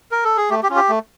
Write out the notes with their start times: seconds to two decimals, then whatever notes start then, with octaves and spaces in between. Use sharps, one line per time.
0.12 A#4
0.24 A4
0.37 G#4
0.50 A3 G4
0.63 G4
0.70 C#4 F4
0.76 G4
0.89 A3